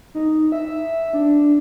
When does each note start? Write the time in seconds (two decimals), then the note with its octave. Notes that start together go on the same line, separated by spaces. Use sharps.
0.15 D#4
0.52 E5
1.13 D4